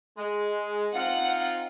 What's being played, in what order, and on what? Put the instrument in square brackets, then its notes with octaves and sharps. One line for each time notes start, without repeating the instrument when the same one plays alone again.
[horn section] G#3
[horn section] C4 D#4 F4 [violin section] F#5